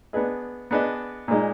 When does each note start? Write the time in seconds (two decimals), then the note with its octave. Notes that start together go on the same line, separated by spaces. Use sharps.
0.13 B3 D4 G#4 B4 D#5
0.71 B3 D4 G#4 B4 D#5
1.28 A#2 G#3 D#4